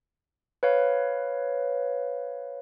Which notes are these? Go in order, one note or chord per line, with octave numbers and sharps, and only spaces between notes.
B4 C#5 F5